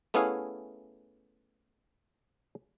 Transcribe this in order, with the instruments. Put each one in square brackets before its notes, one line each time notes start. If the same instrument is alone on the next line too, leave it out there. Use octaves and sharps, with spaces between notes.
[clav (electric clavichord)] A3 B3 C#4 E4 G#4 F5